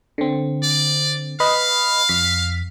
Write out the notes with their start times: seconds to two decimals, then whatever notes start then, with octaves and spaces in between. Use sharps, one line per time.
0.18 D3 C4
0.63 D5
1.40 B4 D#5 F5 B5
2.09 F2 B6